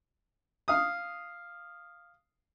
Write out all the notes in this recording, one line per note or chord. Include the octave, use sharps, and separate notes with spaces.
F5 D#6